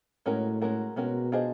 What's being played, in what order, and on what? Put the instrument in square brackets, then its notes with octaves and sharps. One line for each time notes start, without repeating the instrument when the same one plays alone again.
[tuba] A2 [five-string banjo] G#3 C#4 F#4 A#4
[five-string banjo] G#3 C#4 F#4 A#4
[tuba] B2 [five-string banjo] G#3 C#4 F#4 A#4
[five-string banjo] D4 F4 G#4 C5 D#5